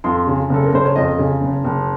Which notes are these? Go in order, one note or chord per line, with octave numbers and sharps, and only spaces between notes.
F2 C6
C#3
F#1 A4
A#4
F#1 C5
C#5
F2 D#5
C#3
F#1
F#1